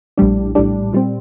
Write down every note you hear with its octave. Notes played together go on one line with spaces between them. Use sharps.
A#1 A2 G3 D4
A#1 A2 G3 D4
A#2 G3 C4